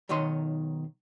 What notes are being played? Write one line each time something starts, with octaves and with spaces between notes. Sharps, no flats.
B1 D#3 C#5 D#5 C6